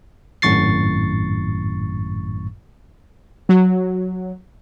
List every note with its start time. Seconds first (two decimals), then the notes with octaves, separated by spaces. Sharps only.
0.42 G#1 F#2 A2 C#6 A6 C7
3.49 F#3